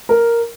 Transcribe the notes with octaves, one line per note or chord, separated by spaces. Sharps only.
A#4